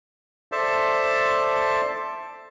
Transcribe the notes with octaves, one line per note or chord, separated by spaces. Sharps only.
A4 C5 D5 E5 A5